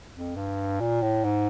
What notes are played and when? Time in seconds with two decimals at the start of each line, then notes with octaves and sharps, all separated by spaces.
0.15 F2
0.36 G2
0.80 A#2
1.02 A2
1.24 G#2